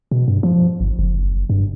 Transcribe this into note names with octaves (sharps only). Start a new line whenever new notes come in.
B2
G2
F3
G#1
F#1
G2